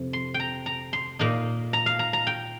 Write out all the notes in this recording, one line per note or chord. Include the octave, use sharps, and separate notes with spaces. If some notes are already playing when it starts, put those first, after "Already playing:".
Already playing: F2 C3
C6
G5
A#5
A#5
C6
A#2 A#3 D#4
A#5
F5
A#5
A#5
G5